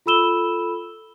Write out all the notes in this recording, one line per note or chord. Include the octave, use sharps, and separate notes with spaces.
F4 A4 B5 E6 E7 G7